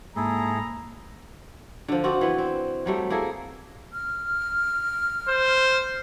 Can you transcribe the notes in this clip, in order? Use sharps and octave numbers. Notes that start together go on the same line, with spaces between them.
G#2 A#3 E4 G#4 A4 A#5
D3 F3
C4 F4 F#4 D5
E3 B3
C4
F#3 G3 A3
A#3 E4 G#4 A4
F6
C5